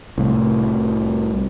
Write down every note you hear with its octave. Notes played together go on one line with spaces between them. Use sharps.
C2 A2